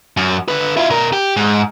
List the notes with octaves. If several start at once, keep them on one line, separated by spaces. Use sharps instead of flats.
F#2
D3 B4
E4 F4
B2 A#4
G4
G#2